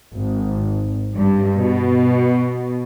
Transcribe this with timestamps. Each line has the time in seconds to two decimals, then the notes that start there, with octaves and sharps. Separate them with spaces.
0.13 G#1
1.16 G2
1.61 B2